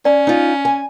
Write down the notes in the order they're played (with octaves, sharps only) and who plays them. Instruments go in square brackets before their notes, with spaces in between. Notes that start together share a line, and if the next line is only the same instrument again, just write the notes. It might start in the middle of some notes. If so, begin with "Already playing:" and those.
[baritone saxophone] C#4 [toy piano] D5
[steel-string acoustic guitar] D#4 F4
G#5